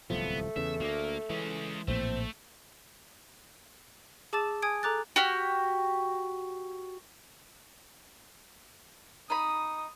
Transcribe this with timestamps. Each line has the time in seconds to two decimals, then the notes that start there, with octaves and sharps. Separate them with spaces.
0.10 D1 C2 F3 A3 B3
0.56 E2 C#3 E3 E5
0.81 D2 A#3
1.30 E3 G#3 C#4
1.88 A#1 A2 A3 A#3 C4
4.33 G#4 A5 D6 E6 A6 E7
4.62 G#5 D#6 G#6 D7
4.83 A4 A#5 D6 F#6 A6
5.16 F#4 G4 F6
9.30 D#4 B5 D#6